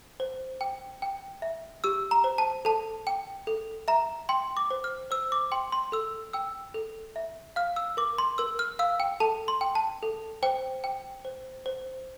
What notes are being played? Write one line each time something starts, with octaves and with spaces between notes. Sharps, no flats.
C5
G5
G5
E5
G4 E6
A#5
C5
A5
A4 A5
G5
A4
E5 A#5
G5 C6
D6
C5
F6
C5 E6
D6
G5 C6
C6
A4 E6
G5 E6
A4
E5
F5 F6
E6
A#4 D6
C6
A#4 E6
F6
F5 E6
G5
A4 A5
C6
G5
A5
A4
C5 G5
G5
C5
C5